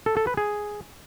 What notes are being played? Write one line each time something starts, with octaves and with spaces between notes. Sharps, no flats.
A4
A4
B4
G#4